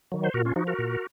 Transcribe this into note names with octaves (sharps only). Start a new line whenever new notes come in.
D#3 F#3
C5
A#2 F#4 A#4
C#4 F4
F3 D#4 F#4
F#4 A#4
A#2